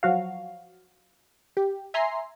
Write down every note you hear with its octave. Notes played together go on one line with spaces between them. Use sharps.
F3 F#3 F#4 F5
G4
E5 G#5 A#5 C6 C7